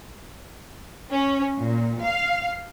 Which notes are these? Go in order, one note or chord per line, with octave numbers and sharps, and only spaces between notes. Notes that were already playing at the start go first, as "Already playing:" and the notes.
C#4
A#2
F5